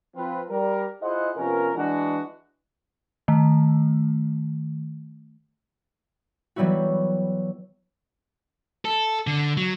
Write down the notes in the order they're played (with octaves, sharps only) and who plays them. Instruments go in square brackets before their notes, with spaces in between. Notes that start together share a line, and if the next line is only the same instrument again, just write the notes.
[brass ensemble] F3 C4 F4 B4
G3 A#4
E4 F4 G#4 C5 D#5 F#5
C3 F3 B3 C#4 A#4
E3 G#3 D4 F#4
[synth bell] D#3 A3
[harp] E3 F#3 G3 B3 E4 F#4
[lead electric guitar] A4
D3
F#3